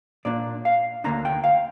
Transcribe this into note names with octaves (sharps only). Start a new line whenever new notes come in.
A#2 A#3 D4 D5
F5
D2 D3 A#3 D4 A#5
G5
F5